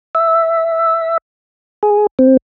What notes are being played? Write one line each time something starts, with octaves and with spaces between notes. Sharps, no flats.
E5
G#4
C4